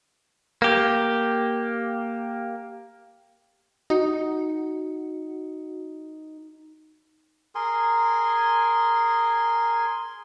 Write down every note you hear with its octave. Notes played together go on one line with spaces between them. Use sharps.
A#3 G4
D#4 F#4
G#4 A#4 G#5 C6